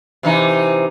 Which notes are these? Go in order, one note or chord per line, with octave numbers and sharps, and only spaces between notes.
C3 E3 D#4